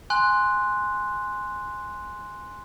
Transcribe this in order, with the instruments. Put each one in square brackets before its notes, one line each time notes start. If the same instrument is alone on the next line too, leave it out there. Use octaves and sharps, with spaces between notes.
[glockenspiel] G#5 C6 F#6